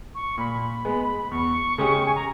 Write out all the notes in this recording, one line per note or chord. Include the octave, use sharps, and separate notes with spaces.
C#6
A#2 B5
G#3 B3
E2 C#6
C#3 G#3 C#4 G4
G#5
A#5